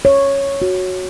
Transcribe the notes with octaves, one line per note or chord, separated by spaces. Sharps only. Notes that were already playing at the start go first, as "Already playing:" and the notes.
C#5
F#4